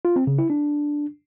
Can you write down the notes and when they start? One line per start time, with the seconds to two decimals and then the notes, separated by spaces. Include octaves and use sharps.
0.05 F4
0.16 C4
0.27 C#3
0.38 E4
0.50 D4